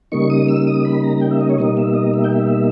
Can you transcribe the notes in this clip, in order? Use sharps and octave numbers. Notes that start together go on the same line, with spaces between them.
C#3 G3 A#3 D#4 C#6
D#6
E6
D#6
B5
A#5
G5
E5
D#5
C#5
B2 G3 A#3 D#4 D#5
E5
D#5
E5
G5
E5